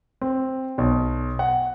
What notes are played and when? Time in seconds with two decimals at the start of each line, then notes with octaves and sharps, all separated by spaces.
0.21 C4
0.78 B1
1.39 F#5